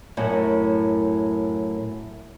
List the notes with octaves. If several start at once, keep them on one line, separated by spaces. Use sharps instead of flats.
F#2 A2